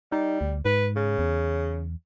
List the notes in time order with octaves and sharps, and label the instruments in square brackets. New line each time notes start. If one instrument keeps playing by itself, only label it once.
[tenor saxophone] G3 [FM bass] D#4
[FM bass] D2
[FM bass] G#2 [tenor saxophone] B4
[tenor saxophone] C#3
[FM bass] E2